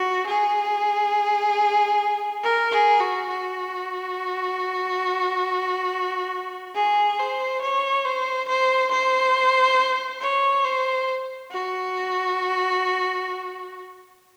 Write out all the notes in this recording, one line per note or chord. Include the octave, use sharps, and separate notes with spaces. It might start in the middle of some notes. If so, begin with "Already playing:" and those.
Already playing: F#4
G#4
A#4
G#4
F#4
F#4
G#4
C5
C#5
C5
C5
C5
C#5
C5
F#4